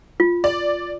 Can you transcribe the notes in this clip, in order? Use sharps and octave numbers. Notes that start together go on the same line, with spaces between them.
F4
D5